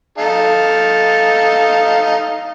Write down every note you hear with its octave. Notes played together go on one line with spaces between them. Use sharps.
D#4 A4 F5